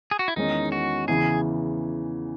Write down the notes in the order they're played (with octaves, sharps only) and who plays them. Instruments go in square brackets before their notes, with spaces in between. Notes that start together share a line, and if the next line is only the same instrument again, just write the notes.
[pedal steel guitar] G#4
F#4
E4
[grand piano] E2 D#3 G#3 C#4 [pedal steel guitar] D#4
[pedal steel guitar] F#4
[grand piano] E2 C#3 E3 [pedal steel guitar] G#4